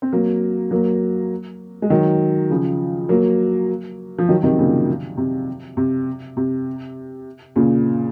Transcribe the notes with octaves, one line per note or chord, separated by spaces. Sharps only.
C4
F#3 A#3
F#3 A#3
G#3
D#3 F#3
C#3 F3
F#3 A#3
F3
D#3 F#3
C3 D#3
A#2 C#3
C3
C3
C3
A#2 C#3